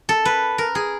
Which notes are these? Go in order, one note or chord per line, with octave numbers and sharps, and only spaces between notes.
A4
B4
A#4
G#4